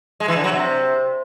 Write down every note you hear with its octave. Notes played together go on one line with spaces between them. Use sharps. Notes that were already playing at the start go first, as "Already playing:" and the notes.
G#3
E3
D3
F#3
C3